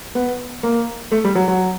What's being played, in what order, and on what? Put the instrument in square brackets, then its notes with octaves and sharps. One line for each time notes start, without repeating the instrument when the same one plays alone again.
[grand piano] B3
A#3
A3
G3
F#3
F#3